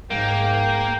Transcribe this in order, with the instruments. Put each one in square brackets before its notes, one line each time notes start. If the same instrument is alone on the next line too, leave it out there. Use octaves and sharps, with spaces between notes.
[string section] G#2 [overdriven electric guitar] A#3 [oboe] G5